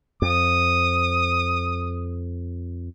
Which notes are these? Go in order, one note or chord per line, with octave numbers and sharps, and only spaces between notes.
F2 D#6